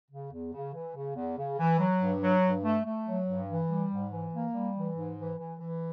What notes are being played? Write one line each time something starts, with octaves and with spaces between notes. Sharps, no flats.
C#3
E2
C#3
E3
C#3
E2
C#3
E3
F#3
G2
F#3
G2
A3
A3
F#3
G2
E3
G3
G#2
E3
A#3
G3
E3
G#2
E3
E3
E3